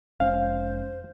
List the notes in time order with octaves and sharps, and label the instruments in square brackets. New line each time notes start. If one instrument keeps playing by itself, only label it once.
[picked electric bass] F1 G#3 C#4 [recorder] C5 [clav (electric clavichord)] F5